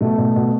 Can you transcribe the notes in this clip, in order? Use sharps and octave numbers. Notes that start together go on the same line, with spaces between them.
B2 A3
B2
B2